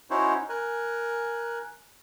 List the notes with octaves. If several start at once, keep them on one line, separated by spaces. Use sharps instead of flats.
C#4 D#4 E4 F#4 C5 C#5
A#4 G#5 F#6